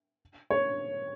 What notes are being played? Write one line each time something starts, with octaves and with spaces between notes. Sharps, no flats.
C#5